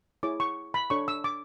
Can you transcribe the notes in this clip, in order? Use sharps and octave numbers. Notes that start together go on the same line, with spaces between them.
E4 G#4 C#5 D6
C#6
B5
D4 A4 C#5 C#6
E6
D6